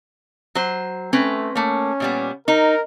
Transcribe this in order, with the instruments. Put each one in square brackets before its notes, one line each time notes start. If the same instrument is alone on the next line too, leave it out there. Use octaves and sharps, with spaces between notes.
[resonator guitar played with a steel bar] F#3 C5
[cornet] A3 [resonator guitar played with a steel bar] C4 C#4 B4
[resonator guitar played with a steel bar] A3 A#3 [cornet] C#4
[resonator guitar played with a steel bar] A#2 G3 B3
[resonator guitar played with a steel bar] D#4 [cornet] A#4